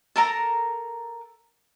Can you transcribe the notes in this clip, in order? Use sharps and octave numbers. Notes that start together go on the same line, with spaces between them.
A4 A#4 A#5